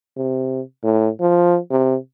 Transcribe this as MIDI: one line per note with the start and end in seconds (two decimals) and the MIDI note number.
0.17 0.61 48
0.83 1.09 45
1.20 1.58 53
1.71 1.96 48